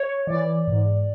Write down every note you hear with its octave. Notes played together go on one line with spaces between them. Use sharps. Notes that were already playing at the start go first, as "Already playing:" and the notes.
Already playing: C#5
E3 D5
G#2